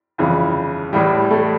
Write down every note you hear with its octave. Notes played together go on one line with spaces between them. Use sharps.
G1 F2 C#3 E3
A1 A2 E3 G3
A3